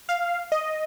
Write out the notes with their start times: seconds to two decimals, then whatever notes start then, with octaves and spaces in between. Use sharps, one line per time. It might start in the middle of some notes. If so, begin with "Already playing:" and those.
0.09 F5
0.52 D#5